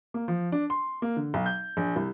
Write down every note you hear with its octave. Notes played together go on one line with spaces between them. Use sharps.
A#3
F3
D4
C6
A#3
D3
B1
G6
A#1
C2